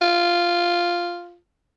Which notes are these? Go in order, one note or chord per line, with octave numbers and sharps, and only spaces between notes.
F4